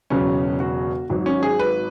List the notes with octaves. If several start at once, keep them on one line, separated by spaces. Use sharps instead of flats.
E1 E2 C#3 F#3 C#4
F#4
G#1 G#2 F#3
C#4
G#4
B4